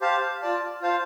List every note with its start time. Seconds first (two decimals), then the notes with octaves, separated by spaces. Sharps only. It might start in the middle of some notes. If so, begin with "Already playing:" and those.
0.01 G4 C5 F5 A5
0.42 F4 D5 A5
0.81 F4 C5 F5 A5